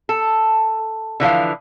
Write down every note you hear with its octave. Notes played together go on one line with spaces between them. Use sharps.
A4
D3 E3 F3 F5